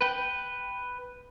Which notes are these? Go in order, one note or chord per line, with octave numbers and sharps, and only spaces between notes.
B4 G5